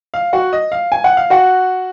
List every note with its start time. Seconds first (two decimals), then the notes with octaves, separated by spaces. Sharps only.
0.14 F5
0.33 F#4 F#5
0.53 D#5
0.72 F5
0.92 G#5
1.04 F#5
1.17 F5
1.30 F#4 F#5